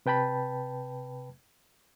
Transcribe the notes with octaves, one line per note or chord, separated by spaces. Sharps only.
C3 B4 G5 A5 B5